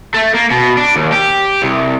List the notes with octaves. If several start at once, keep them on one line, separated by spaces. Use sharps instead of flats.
A3
A#3
B2
D4
D#2
G4
C2